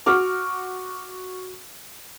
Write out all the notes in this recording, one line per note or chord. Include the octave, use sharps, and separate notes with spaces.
F#4 D6 F6